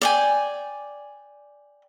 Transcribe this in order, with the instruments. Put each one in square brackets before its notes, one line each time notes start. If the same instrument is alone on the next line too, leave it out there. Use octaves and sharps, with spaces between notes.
[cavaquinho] D5 G5 G#5